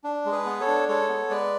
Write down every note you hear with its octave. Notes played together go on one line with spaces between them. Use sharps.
D4
G#3
G#4 B4
B3
A4 C#5
D4
G#3 A4 C#5
B3
G#3 B4 D5